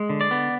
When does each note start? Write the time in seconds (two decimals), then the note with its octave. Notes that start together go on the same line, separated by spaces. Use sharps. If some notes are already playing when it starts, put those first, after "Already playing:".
Already playing: G#3
0.10 D3
0.21 D5
0.31 B3